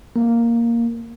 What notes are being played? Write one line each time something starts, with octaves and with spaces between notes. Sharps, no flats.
A#3